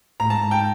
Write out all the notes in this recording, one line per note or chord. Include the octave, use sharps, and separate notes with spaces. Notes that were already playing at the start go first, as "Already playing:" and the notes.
A2 A#5
G#2 A5
G#2
G5